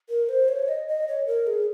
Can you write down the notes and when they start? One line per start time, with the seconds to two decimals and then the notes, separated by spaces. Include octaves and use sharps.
0.09 A#4
0.29 C5
0.48 C#5
0.68 D#5
0.88 D#5
1.08 C#5
1.27 A#4
1.47 G#4